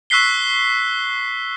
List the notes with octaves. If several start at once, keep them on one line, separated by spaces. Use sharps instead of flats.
C#6 E6 F#6 B6 C7 G7